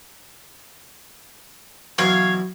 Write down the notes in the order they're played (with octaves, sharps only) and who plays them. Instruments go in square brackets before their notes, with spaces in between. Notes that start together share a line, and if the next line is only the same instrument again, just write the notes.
[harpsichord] B2 E3 F#3 [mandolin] C#5 F5